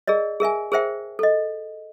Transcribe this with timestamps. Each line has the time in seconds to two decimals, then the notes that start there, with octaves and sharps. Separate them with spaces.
0.07 G#4 A#4 D5 D#5
0.40 G#4 A#4 E5 G#5
0.72 G#4 A#4 C5 E5 G5
1.19 A4 D#5